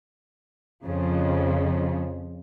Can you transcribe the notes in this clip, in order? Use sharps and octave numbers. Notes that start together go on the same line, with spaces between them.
F2 C#3 F3